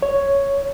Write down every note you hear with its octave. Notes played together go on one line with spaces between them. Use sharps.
C#5